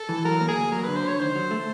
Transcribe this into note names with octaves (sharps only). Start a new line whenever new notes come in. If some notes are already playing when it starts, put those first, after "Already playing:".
Already playing: A4
E3
F#3 A#4
A#3
G#4
D2
F#3 A#4
D3 B4
C5
D2 C#5
D#3 C5
F#3
A3